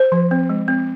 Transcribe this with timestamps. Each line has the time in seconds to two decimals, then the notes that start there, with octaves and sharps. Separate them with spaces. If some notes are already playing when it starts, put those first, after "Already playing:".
Already playing: C5
0.12 F3
0.31 C4
0.49 G#3
0.68 C4